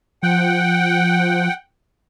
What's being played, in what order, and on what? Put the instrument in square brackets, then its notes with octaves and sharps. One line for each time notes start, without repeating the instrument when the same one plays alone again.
[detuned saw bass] F3 [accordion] F#5 G5